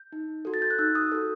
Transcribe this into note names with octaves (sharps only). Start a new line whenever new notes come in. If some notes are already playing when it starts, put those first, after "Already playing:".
Already playing: G6
D#4
F#4 A4
A6
G6
F#6
D#4 E6
D#6
F#4 A4